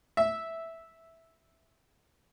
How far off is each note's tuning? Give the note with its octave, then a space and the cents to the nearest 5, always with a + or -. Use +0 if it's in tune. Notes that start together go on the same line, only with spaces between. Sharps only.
E5 -5